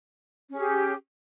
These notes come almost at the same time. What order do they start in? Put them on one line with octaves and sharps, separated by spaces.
C#4 G#4 G4